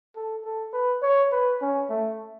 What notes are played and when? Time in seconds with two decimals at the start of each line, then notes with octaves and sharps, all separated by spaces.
0.16 A4
0.44 A4
0.73 B4
1.02 C#5
1.32 B4
1.61 C#4
1.89 A3